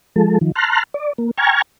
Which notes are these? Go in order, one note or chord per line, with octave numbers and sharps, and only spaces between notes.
F3 G#3 A4
D#3 F3
A5 A#5 C6 F6 F#6
D5
A#3
G5 G#5 A#5 C#6 F6 G#6